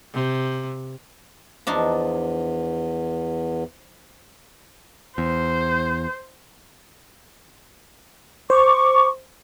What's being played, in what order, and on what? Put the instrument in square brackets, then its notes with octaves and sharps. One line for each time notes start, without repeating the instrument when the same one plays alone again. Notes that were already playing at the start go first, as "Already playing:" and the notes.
[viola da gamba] C3
[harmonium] E2 [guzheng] F3 D4 D#4
[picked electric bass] E2 [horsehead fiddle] C5
[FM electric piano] C5 [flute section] C#6 D6